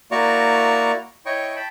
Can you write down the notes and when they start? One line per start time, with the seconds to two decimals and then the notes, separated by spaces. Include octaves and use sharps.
0.11 A#3 E4 F#4 D5 A#5 C#6
1.26 E4 C#5 D#5 G5 C#6
1.56 G5 A5 B5